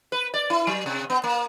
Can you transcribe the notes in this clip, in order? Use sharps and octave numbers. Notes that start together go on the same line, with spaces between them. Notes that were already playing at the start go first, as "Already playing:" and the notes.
B4
D5
E4
F#3
C3
B3
A#3